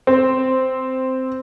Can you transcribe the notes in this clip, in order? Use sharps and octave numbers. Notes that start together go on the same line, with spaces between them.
C4